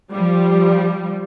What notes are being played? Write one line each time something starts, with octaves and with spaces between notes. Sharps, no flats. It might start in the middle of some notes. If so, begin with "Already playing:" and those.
F3 G3